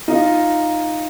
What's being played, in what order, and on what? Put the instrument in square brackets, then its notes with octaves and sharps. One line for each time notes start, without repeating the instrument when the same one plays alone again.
[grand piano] D#4 F4